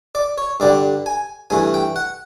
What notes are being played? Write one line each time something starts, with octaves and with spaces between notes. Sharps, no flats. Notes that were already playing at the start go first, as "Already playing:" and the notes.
D5
C#5
G2 D3 G3 D5
G#5
G2 E3 A3 G#5
G5
F#5